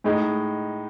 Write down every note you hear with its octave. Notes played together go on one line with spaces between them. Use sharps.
A2 G#3 D#4